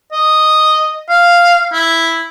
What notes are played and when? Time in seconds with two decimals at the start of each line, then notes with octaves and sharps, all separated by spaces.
0.12 D#5
1.09 F5
1.73 E4